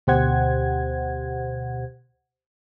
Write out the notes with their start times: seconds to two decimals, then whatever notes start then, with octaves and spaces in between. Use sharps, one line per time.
0.07 D2 B2 G4 C5 F#5 G#6